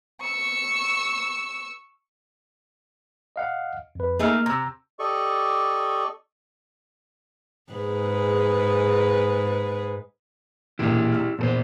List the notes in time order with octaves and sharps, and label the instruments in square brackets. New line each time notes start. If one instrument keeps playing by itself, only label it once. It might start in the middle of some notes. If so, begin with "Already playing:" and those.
[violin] C#6 E6
[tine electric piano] D#5 F5 F#5
F2 B4
[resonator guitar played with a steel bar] A3 D#4 G#4 [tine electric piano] A#3 F6
[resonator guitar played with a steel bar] C3 [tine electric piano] A#5 E6
[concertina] G4 A4 D5 D#5 C#6
[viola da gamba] G#2 G#4 B4
[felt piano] E1 A#2 F6 [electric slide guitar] E4 G4
[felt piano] E6 F6
[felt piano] E2 [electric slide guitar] A#2 A4 C5